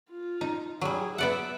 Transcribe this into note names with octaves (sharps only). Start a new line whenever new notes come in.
F4
D#4
F#3 G3 G#4
B3 D5 E5 F#5